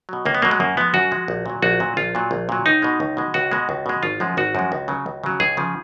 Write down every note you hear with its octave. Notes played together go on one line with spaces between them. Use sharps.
B2 F#3
C#2 A#3
B3
B2 F#3 A#3
G#3
F#2 A#3
F3 G#3 B3
F#2 F#4
F3 G#3
A#1
A#2 F#3
A#1 F#4
A#2 F#3
A#1 F4
A#2 F#3
A#1
A#2 F#3
C#2 D#4
B2 G#3
C#2
B2 G#3
C#2 F#4
B2 G#3
C#2
B2 G#3
G#1 F4
F#2 F3 G#3
G#1 F#4
F#2 F3 G#3
C#2
C#3 F#3
C#2
C#3 F#3
C#2 G#4
C#3 F3